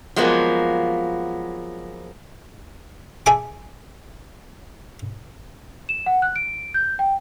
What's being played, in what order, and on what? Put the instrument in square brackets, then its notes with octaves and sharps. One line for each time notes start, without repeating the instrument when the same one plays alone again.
[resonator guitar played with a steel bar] F3 F#3 G#3 A#3 B3
[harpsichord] G#4 E5 G#5 A5 D6
[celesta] E7
F#5
F#6
D7
G6
G5